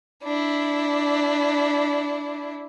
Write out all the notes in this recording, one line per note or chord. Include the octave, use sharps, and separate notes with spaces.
D4 E4